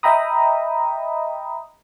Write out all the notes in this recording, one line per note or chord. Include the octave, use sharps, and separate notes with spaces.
D#5 E5 G5 A#5 B5 D#6